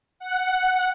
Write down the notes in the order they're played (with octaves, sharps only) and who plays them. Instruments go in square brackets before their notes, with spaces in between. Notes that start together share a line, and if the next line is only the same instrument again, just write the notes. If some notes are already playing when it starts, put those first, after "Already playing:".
[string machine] F#5